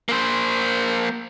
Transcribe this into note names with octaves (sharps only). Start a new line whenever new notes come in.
A#3 C5